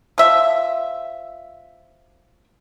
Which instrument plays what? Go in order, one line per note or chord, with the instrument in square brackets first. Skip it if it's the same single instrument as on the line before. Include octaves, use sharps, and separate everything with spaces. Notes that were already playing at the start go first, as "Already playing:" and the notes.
[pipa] F3 E5